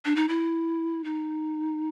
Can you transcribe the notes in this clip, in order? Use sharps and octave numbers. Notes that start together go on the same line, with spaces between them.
D4
D#4
E4
D#4